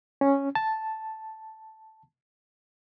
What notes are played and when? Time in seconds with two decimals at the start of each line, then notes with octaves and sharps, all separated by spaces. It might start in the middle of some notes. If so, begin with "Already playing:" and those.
0.21 C#4
0.55 A5